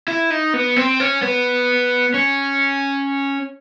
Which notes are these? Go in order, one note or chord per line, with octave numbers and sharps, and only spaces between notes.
E4
D#4
B3
C4
C#4
B3
C#4